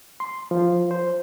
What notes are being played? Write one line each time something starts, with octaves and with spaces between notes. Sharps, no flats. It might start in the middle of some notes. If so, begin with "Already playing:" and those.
C6
F3
C5